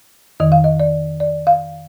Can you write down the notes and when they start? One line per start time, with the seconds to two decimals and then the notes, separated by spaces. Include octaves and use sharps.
0.40 F2 D#3 D#5
0.52 F5
0.64 D#5
0.80 D5
1.20 D5
1.47 F5